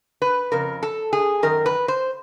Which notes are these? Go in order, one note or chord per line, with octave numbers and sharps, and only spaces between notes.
B4
F2 C#3 A#4
A4
G#4
F#2 D#3 A#4
B4
C5